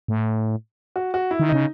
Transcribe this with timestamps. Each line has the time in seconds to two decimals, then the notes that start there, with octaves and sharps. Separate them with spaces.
0.08 A2
0.96 F#4
1.14 F#4
1.31 E4
1.40 D#3
1.49 C#3 D#4